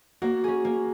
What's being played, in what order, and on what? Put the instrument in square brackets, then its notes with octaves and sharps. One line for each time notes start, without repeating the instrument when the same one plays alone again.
[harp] A#3 [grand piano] F#4
[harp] C#4 G#4
A#3